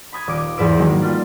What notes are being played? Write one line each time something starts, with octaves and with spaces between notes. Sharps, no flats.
B5 D#6 G#6
D#1 D6 D7
E2 G#2 B4 E6 D7
D#3 F#3 G#3 A#3
G3 F4